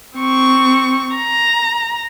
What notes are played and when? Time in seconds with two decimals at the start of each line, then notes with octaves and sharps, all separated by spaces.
0.17 C4 C#6
1.16 A#5